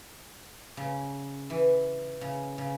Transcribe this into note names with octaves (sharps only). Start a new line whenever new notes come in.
C#3
E3
C#3
C#3